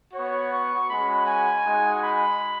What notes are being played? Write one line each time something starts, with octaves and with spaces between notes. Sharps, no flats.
B3 F#4 C#5
C#6
G#3 C#4 F#4 B5
G#5
G#3 D#4 F#4
B5